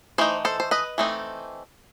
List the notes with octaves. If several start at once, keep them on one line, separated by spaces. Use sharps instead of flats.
E3 A3 D#4 C5
A4 C5
C5
B4 D#5
E3 A3 C4 D#4